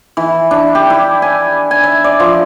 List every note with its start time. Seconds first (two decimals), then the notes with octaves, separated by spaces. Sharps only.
0.17 E3
0.51 D4
0.75 G4
0.90 E4
1.22 G#5
1.71 G#5
1.84 E5
2.04 D5
2.20 F3